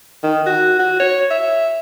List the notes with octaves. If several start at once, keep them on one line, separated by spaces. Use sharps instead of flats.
D#3
F#4
F#4
C#5
E5